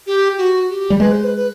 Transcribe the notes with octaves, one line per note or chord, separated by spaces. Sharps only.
G4
F#4
G4
G3
G#3 B4
C5
B4
B4